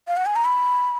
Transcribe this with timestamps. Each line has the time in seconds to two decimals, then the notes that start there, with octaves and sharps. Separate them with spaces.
0.08 F5
0.17 F#5
0.26 G#5
0.36 A#5
0.45 B5